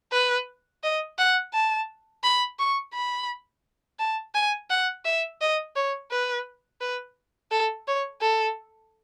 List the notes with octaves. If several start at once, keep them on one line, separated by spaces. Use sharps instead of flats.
B4
D#5
F#5
A5
B5
C#6
B5
A5
G#5
F#5
E5
D#5
C#5
B4
B4
A4
C#5
A4